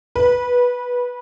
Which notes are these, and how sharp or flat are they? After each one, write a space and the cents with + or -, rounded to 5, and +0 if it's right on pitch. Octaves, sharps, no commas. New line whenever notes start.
B4 -15